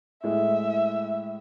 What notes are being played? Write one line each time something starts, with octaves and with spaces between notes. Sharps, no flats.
A2 G#3 E5